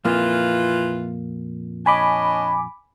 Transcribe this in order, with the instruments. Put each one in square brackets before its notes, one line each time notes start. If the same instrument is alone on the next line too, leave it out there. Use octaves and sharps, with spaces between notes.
[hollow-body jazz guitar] F2 A#2 A#3 [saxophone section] E3 F4
[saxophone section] D4 C#5 D#5 [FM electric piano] G#5 B5 D6